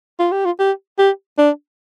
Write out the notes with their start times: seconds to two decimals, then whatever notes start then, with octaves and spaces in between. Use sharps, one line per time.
0.19 F4
0.32 G4
0.46 F4
0.59 G4
0.98 G4
1.38 D4